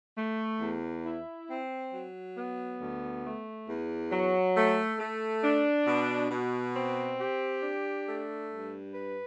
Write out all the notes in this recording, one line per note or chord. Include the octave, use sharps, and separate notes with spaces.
A3
E2
E4
C4
F#3
B3
D2
A3
E2
F#3
A3
A3
D4
B2
B2
C4
G4
D4
A3
G2
B4